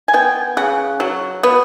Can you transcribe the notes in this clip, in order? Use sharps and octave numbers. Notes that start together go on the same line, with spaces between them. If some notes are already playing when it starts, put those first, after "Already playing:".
G#5
B3 G5
C#3 F#5
F#3
B3